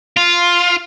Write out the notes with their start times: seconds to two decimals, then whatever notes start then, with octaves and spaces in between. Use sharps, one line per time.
0.17 F4